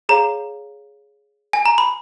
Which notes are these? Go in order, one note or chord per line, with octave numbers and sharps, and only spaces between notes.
G#4 C#5 F5 A#5
G#5
A#5
B5